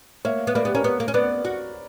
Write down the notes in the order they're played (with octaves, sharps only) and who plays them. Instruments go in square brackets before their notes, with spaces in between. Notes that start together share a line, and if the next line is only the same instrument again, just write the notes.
[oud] A#3 [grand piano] C#5 E5
[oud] B3
[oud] A#3 [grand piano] B4 D5
[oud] B3 [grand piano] G4 B4
[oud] C#4 [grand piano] A#4 C#5
[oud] B3
A#3
C#4
[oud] B3 [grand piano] B4 D5
[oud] F#4